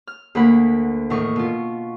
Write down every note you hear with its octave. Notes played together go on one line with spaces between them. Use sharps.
F6
D2 A#3 A#4 F#5 B5
E2 A2 D#3 A#4 C#6
B2 F4